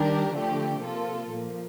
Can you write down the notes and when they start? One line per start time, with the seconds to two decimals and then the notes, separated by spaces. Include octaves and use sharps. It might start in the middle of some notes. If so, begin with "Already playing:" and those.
Already playing: D#3 G3 D4 G4 A#4
0.34 D3 F3 A3 D4 G4
0.82 C3 F3 A#3 F4 A4
1.30 A#2 F3 A#3